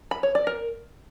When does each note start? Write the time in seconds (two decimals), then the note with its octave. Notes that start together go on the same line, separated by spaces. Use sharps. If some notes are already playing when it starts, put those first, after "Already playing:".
0.11 B5
0.23 C#5
0.35 D5
0.47 A#4